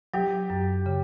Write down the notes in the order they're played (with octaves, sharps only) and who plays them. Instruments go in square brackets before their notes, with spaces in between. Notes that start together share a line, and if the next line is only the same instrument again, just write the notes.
[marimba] F#3 [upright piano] G4
[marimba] F#2
C#3